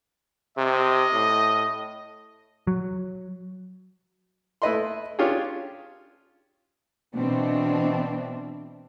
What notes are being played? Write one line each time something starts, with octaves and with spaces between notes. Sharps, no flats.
C3 D#5
A2
F#3
A3 E4 B4 D#5 B5 C6
C#4 D4 F4 G4 G#4 C#5
B2 E3 C4 D4